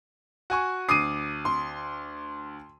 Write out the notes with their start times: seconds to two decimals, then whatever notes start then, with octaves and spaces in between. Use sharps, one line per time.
0.50 F#4 G#5 C#6
0.89 D2 D6 D#6 C7 D#7
1.45 C6